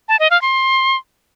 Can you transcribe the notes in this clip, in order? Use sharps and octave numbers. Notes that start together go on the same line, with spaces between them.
A5
D#5
F5
C6